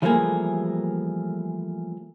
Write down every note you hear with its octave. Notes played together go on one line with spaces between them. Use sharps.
E3 F3 G3 A3 A#3 G#4